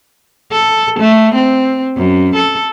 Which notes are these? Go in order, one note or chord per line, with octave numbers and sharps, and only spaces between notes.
A4
A3
C4
F#2
A4